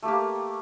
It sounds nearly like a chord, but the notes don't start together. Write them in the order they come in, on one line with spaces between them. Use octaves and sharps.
A3 G4 A#3